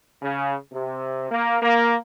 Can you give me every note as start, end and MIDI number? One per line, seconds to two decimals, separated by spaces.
0.22 0.55 49
0.72 1.28 48
1.31 1.57 58
1.62 1.95 58